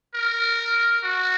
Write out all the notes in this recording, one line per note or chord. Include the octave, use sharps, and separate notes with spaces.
A#4
F#4